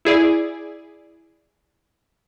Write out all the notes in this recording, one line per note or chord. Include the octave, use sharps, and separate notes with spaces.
E4 G#4 D5